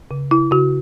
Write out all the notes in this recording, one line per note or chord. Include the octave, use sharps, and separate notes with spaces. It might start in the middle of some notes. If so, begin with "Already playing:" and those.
C#3
C#3 E4
C#3 F#4